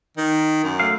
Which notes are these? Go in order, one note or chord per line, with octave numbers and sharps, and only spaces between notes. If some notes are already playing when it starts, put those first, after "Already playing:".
D#3
F#2
A3 F5